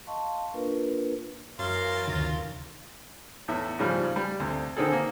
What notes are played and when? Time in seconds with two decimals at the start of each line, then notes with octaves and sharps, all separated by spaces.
0.07 D#5 F5 A5 C6 C#6
0.54 A#3 D4 F4 A#4 B4
1.59 F#2 E3 F#3 A#4 F5 C6 A6
2.08 D2 C3 D#3 F4
3.48 E2 A2 E5
3.79 G#2 C#3 F3 G3
4.16 G3
4.40 D2 C3
4.77 D3 D#3 C4 G#4 A4
4.92 A#3